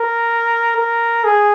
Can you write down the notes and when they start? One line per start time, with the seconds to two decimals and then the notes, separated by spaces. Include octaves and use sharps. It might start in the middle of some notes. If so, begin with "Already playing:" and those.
Already playing: A#4
0.77 A#4
1.25 G#4